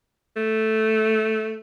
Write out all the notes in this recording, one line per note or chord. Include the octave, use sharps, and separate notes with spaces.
A3